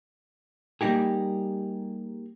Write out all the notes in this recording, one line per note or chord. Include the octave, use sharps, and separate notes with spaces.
G3 A#3 D#4 G4 G#4